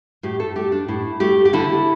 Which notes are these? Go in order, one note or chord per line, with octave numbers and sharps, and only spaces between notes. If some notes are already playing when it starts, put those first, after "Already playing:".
A2 G4
A4
A3 G4
D4
A2 E4
A3 G4
G4
D3 E4